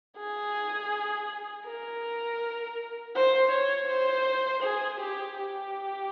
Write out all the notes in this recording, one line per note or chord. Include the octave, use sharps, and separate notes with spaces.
G#4
A#4
C5
C#5
C5
G#4
G4
G4